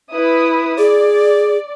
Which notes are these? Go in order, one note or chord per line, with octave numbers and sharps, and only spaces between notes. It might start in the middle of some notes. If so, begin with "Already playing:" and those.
E4 B4 D#6
G#4 D5